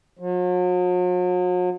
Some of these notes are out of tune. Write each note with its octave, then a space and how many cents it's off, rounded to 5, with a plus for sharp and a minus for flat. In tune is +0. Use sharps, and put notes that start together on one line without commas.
F#3 -45